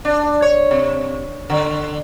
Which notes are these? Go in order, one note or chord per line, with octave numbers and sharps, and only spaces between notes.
D4
C#5
C3
D3